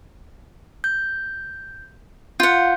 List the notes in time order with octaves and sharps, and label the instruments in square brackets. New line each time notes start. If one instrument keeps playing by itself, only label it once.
[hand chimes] G6
[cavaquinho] F4 F#5 [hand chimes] F5 G6